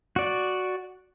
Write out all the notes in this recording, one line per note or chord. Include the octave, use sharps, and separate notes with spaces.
F#4 D5